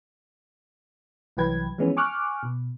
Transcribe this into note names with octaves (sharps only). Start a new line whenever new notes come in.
C2 E3 F#3 B4 G5 G#6
E3 F3 G#3 B3 C#4
G#5 C#6 D6 F6 F#6
B2